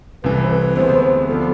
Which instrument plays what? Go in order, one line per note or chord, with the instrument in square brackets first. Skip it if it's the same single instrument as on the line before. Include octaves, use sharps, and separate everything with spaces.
[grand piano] C2 C3 E3 A3 [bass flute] B4
[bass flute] C5
B4
[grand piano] D2 C3 G#3 B3 [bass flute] C5
[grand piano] D2 D3 F3 B3 D4 [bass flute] A4